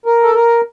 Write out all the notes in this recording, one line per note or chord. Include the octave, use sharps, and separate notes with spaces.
A#4
A4
A#4